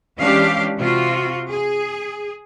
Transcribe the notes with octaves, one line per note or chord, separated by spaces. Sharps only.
E3 G#3 C#4 D4 G4 F5
C3 F4 F#4
G#4